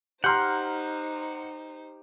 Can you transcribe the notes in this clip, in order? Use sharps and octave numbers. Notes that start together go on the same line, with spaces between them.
D#4 G4 C5 F#5 A#5 C6 F6 G6